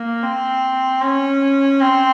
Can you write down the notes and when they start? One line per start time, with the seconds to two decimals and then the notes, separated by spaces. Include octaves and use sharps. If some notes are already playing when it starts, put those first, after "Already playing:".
Already playing: A#3
0.23 C4
1.02 C#4
1.81 C4